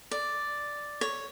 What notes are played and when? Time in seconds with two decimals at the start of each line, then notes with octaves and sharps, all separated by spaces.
0.11 D5
1.01 C#5